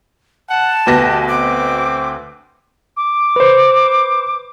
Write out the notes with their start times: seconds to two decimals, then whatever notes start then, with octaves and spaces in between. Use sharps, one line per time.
0.49 F#5 A5
0.87 D2 B2 G4 B4 F#6 A#6
1.28 C4 D6
2.97 D6
3.36 B4 C5